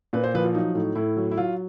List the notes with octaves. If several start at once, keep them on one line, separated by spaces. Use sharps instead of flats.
A#2 B4
C5
F3 B4
F4
F#3 D#4
A2 D#4
A2 E4
F#3
E4
F#3 F4